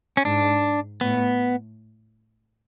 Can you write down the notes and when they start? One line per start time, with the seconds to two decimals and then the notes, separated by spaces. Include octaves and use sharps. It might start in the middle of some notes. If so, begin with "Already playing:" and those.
0.17 C#4
0.24 G#2 D4
1.01 A2 B3